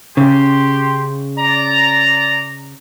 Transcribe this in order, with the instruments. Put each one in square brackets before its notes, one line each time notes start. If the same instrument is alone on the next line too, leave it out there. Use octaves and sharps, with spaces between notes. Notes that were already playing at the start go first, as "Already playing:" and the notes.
[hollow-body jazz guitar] C#3 [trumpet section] G4 C6
[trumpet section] D5 A#5